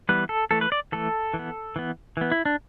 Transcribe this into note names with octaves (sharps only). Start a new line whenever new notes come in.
E3 G3 B3 B4
A4
E3 A3 A4
B4
D5
E3 A3 A4
E3
B3
E3 B3
E3 B3
E4
D4